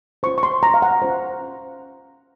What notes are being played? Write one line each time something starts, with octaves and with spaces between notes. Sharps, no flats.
C#4 F4 C5 C#6
C#6
C6
A#5
F5
F#5
C#4 F4 C5